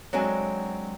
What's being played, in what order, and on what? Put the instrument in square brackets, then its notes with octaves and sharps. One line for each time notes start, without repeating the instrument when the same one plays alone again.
[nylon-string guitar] F#3 G#3 C4 D4 A4 G#5